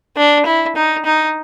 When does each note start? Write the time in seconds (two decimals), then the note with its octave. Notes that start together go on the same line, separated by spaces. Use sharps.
0.17 D4
0.46 E4
0.76 D#4
1.05 D#4